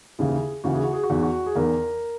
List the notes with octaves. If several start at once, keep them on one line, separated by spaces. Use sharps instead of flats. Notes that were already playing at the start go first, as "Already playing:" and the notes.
D#2 C#3 E3 G#4
D#2 C#3 E3 F#4
G#4
F#4
G#4
F#4
E2 D#3 G#4
F#4
G#4
E2 D#3 A#4